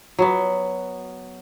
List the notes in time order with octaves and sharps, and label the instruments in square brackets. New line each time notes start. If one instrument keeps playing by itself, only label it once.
[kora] F#3 B3